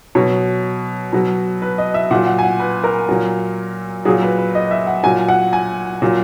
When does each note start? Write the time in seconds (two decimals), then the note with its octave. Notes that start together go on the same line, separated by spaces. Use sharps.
0.15 B2 F#3 C#5
1.13 B2 F#3
1.62 B4
1.78 D#5
1.94 E5
2.11 A#2 F#5
2.14 F#3
2.27 F#5
2.39 G#5
2.43 F#5
2.60 B4
2.84 A#4
3.09 A#2 F#3
4.05 A#2 F#3 G#4
4.23 B4
4.38 B4
4.55 D#5
4.71 E5
4.87 F#5
5.03 A#2 F#3 G#5
5.28 F#5
5.53 G#5
6.02 A#2 F#3